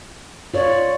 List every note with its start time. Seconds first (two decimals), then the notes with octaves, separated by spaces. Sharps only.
0.54 F4 C#5 D5